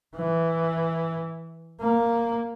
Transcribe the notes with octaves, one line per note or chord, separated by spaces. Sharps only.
E3
A#3